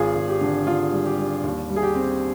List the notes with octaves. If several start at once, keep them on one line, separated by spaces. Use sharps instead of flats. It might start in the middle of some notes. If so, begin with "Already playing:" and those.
Already playing: G#1 F4 G#4
G#1
G4
D3
D3 F4
G3
G4
G3
D#2
G3
G#4
G4
C4